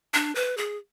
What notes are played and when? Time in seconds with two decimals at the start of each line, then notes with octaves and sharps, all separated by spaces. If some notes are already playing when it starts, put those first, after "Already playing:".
0.14 D4
0.35 B4
0.57 G#4